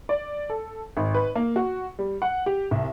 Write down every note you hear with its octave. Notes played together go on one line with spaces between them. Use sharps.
D5
A4
G#1
B4
A#3
F#4
G3
F#5
G4
C2